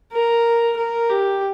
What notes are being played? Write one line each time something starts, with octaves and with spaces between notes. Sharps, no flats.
A#4
A#4
G4